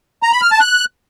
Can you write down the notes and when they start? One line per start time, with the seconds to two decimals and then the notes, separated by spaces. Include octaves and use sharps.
0.23 A#5
0.32 B5
0.42 F6
0.51 A5
0.60 F#6